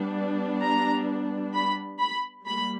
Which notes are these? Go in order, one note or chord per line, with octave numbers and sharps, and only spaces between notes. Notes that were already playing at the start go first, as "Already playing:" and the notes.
Already playing: G3 B3 D4
A#5
B5
B5
G3 A#3 B5